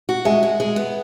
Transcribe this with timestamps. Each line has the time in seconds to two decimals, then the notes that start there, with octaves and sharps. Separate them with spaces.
0.09 F#4
0.25 G#3 E5 G#5
0.43 G#3
0.60 G#3
0.76 B3